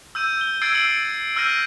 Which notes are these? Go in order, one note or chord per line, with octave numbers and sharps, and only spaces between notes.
E6 G6 D#7
G7
E6 G#6 A6 C7 D7
E6 C#7 D7 F#7
E6 F6 G6 A#6 D#7